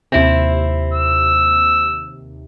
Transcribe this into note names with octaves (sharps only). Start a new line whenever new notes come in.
D#2 C3 C4 E4
E6